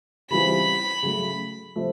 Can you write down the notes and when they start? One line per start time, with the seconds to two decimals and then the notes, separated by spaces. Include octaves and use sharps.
0.30 C#3 E3 G3 C4 F4 B5
1.03 C#3 F#3 A3
1.76 C3 F3 A3